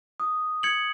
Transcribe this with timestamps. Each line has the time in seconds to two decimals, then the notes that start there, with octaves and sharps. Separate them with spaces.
0.20 D#6
0.63 G#6 C#7 F#7